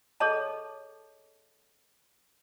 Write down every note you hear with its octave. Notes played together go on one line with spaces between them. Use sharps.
G#4 A4 C#5 D#5 A5